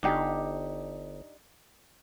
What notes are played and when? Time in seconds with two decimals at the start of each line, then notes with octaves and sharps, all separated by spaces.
0.03 G1 D4 D#4 G4